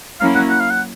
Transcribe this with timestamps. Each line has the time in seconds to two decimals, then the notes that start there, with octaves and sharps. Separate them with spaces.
0.21 F#3 A#3 C#4 E4 F5
0.35 F#5
0.50 F#5
0.61 F5
0.71 F#5